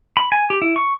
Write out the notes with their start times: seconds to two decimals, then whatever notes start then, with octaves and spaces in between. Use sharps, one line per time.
0.17 B5
0.32 G#5
0.50 G4
0.62 E4
0.76 C#6